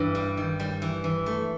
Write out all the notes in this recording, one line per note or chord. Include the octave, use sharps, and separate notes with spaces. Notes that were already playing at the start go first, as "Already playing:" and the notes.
Already playing: G2 E3
G3
D#3
G3
E3
E3
A3